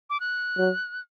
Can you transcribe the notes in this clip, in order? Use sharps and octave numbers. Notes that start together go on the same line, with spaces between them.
D6
F#6
F#3